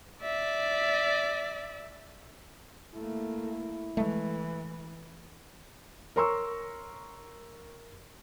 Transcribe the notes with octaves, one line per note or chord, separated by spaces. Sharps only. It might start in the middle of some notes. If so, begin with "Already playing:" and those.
D5 E5
A3 A#3 E4
E3 G#3 A3
A#4 C#5 A#5 C6 C#6 E6